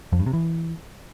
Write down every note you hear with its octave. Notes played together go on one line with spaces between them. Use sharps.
F2
G2
C3
E3